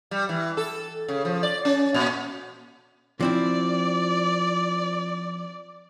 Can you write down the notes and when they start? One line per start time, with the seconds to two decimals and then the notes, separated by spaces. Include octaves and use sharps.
0.11 G3
0.29 E3
0.57 A4
1.08 C#3
1.25 F3
1.43 D5
1.65 C#4
1.94 A#2
3.21 F3 C4 E4 D5